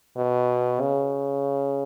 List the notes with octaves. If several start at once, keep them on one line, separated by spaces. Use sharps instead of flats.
B2
C#3